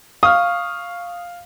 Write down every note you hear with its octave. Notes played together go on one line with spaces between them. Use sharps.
F5 C#6 D#6 F6